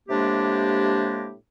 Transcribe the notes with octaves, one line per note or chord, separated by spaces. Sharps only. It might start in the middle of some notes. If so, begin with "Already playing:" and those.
A2 C3 G#3 A#3 D4 G4